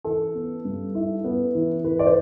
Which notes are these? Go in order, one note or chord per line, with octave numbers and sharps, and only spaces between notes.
E3 A4
B3
G2
E4
B3
E3
E3 B4
D5
C5